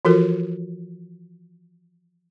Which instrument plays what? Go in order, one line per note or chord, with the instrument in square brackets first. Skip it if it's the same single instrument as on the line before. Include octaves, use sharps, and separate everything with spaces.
[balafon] E3 F3 F4 F#4 A4 A#4